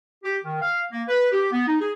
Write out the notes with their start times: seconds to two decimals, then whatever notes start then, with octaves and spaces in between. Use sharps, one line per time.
0.24 G4
0.44 D#3
0.62 F5
0.91 A#3
1.08 B4
1.32 G4
1.52 B3
1.67 D#4
1.81 G#4